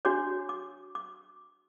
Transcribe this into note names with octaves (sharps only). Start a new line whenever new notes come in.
D4 F#4 C#5 D6
D6
D6